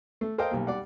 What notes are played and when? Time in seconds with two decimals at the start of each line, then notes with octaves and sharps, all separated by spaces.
0.21 A3
0.38 A4 A#4 C5 D#5 F5 G5
0.51 B1 G3 A#3
0.67 G3 D5 F#5